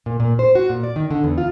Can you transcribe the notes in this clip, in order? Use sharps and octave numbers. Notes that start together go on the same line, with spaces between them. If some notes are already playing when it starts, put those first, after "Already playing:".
A#2
A#2
C5
F#4
A#2
D5
D#3
D3
E2
F4